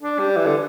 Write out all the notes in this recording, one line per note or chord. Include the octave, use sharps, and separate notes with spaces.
D4
G3
E3
D3